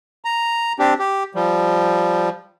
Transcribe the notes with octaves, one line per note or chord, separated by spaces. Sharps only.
A#5
C4 D4 G4
G4
F3 G3